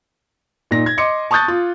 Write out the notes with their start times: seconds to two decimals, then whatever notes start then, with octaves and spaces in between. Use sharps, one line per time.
0.71 A#2 D#4 A#6
0.86 G#6
0.97 D#5 C6 D6 C#7
1.31 A5 C#6 D#6 F#6 G6 A6
1.48 F4